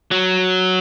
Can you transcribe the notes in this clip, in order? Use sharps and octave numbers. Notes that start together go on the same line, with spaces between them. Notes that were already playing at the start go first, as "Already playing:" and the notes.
F#3